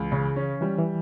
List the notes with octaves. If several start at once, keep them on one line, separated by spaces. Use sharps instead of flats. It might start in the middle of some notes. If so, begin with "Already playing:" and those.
Already playing: C#2 E3
C#3
C#4
E3 G3
E3